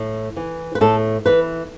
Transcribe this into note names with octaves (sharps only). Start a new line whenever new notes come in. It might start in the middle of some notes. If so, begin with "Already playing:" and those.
Already playing: A2
E3
B4
A2 A4
E3 B4